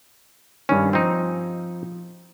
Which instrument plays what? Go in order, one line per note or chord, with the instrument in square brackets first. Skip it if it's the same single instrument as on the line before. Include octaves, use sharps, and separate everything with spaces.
[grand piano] G2 D#3 [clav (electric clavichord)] C#4
[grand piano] F3 [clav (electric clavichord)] C4 D#4